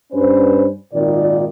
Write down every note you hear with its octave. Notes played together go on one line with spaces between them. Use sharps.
G2 C#4 B4 C5
G#1 A#2 D#3 F4 D5